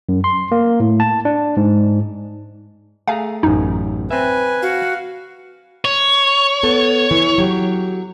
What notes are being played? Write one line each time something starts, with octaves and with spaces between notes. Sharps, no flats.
F#2
C6
A#3
A2
A5
D4
G#2
A3 G#4 F5 G#5 A#5
A1 F#2 D#4
C4 B4 E5 G#5
F#4 F5
C#5
B3 A4
E3
F#3 G4